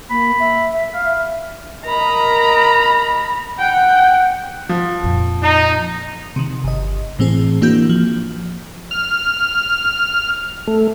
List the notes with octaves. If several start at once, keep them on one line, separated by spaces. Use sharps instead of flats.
A#3 B5
E5
E5
F5
A#4 D#5 A#5 B5
F#5 G5
F3
F2 A#2
D#4
C3 D#3
G1 D#5
A2 E3 C4 G#4
E3 A#3 D4 E4 F#4 G6
F3
F6
A3